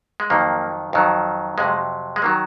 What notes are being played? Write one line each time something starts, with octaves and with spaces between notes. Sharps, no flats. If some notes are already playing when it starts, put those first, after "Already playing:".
G#3
F2 D#3 F#3 A#3
F2 D#3 F#3
F2 C3 F#3 G#3
G#3
D#3 F#3 A#3